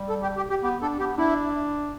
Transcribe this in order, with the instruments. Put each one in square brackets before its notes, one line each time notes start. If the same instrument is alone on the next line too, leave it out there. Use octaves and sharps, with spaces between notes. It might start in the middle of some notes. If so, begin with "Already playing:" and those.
Already playing: [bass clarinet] G3
[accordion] A4
G4
G4
G4
[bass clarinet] B3 [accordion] G4
[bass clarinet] D4 [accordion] A4
[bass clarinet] B3 [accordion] G4
[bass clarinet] D4 [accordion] E4